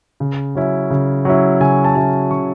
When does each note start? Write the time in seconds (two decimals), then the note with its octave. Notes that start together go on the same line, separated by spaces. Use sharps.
0.20 C#3
0.55 F#3 C#4 E4
0.90 C#3
1.25 F#3 C#4 E4
1.60 C#3 G#5
1.85 A5
1.95 F#3 C#4 E4
2.31 C#3 C#6